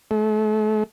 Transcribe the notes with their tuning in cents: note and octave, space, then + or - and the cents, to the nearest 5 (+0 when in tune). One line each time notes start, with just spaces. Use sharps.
A3 -40